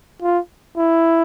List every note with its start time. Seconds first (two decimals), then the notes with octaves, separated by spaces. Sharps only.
0.22 F4
0.78 E4